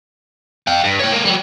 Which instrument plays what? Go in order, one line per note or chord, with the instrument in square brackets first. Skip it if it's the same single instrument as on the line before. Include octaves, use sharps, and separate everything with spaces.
[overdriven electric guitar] F5 G5
G2
C#5 G5
G#3 A#3
F#3 G3